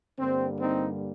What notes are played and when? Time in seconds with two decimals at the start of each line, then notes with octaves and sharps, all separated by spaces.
0.18 G2 D3 G3 A#3 C4
0.59 C4 D#4